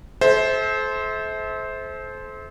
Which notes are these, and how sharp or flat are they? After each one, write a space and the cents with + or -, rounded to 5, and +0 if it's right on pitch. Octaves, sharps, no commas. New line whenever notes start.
A4 -35 C5 +0 E5 -35